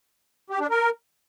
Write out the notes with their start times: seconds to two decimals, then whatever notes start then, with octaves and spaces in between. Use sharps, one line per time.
0.50 G4
0.60 D4
0.70 A#4